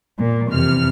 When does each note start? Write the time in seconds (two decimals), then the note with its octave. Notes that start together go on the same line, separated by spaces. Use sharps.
0.18 A#2
0.49 F2 C3 E3 F6